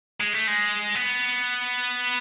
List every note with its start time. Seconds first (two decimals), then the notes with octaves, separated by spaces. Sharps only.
0.20 G#3
0.33 A3
0.48 G#3
0.95 B3